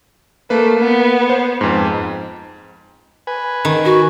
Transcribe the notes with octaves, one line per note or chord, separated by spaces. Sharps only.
A3 A#3 B4
B3
C5
F2 G#2
B4 G#5
D#3
F#4